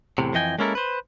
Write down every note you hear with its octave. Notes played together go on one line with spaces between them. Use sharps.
E2 A2 C3
F2 E3 D#5 G5 G#5
G#3 A#3 C#4 E4 A4 A#4
B4 C5